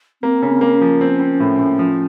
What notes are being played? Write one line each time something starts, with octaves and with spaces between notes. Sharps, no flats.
A#3 C4
C#3
C4
A#3
C#4
F3
C4
C4
A2
A2
F3